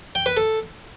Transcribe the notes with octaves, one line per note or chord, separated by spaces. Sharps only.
G5
B4
A4